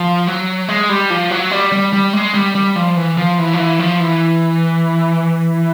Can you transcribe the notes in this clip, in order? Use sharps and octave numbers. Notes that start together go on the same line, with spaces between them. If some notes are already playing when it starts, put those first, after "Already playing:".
Already playing: F3
F#3
G#3
G3
F3
F#3
G3
G3
G3
G#3
G3
G3
F3
E3
F3
E3
F3
E3
F3
E3